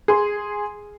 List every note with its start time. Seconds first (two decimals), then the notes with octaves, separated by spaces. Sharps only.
0.08 G#4 C6